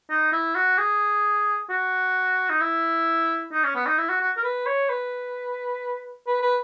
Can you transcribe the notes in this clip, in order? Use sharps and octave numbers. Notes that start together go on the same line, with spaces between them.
D#4
E4
F#4
G#4
F#4
D#4
E4
D#4
C#4
B3
D#4
E4
F#4
F#4
A#4
B4
C#5
B4
B4
B4